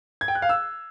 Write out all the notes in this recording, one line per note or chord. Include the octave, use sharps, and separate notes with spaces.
G#6
G5
F#6
F5
E6